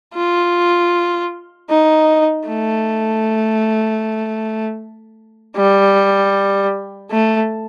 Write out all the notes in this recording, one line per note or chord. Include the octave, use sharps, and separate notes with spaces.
F4
D#4
A3
G3
A3